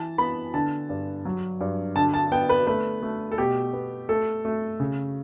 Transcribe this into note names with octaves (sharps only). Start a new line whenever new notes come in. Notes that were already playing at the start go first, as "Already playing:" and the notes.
Already playing: E3 A5
B3 B5
D3 A5
G2
F#3
G2
D3 A5
A5
B3 G5
B4
A3 B4
A3
A4
B2 G4
B3
A3 A4
A3
C#3